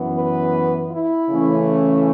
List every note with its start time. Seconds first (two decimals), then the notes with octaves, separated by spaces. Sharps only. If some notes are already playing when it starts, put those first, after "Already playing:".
Already playing: F#2 E3 B3
0.15 B4
0.91 E4
1.29 C#3 E3 A3 C#4